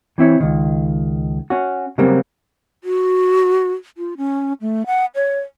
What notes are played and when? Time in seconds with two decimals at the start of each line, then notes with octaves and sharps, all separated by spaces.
0.18 E3 C4 E4 C#5
0.40 C#2 D#3
1.50 C#4 F#4
1.98 C#3 F#3 G3 A#3 C4
2.84 F#4
3.98 F4
4.17 C#4
4.61 A3
4.86 F#5
5.15 C#5